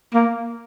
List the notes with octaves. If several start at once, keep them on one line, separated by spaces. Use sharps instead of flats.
A#3